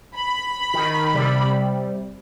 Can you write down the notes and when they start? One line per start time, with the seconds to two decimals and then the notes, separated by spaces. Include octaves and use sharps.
0.15 B5
0.74 D#3
1.14 C3 G3